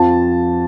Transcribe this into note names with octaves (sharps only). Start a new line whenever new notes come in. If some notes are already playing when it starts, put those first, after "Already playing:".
Already playing: F2 F3 A5